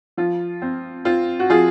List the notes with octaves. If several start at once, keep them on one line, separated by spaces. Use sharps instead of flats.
F3 F4
C4
C4 F4
F#4
F3 F4 G#4